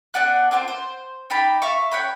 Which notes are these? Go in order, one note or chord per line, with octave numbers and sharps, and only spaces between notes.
B3 D4 F#5 F#6
A#3 C4 F4 C5
C5
D#4 G4 A5 B5
E5 F5 C#6
C#5 F#5 G5 B5